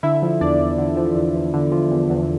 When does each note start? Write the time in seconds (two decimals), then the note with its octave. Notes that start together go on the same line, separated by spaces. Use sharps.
0.03 D3 E4 E5
0.22 F3
0.41 E2 D4 D5
0.60 E2
0.78 D3
0.97 F3
1.15 E2
1.35 E2
1.54 D3
1.72 F3
1.91 E2
2.10 E2